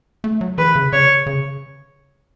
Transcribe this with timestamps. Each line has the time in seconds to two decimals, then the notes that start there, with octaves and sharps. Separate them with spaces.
0.24 A3
0.41 F#3
0.58 E3 B4
0.75 C#3
0.92 C#3 C#5
1.26 C#3